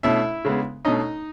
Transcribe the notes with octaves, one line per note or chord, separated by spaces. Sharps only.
B2 A3 C#4 E4 E5
C#3 G#3 B3
B2 A3 C#4 D#4 D#5